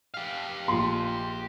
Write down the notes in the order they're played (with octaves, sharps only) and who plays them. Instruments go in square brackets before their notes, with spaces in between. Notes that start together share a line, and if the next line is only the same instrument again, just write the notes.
[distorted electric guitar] G4 F5
[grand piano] A#1 F4 C6